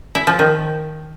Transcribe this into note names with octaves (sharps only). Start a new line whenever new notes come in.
E4
F3
D#3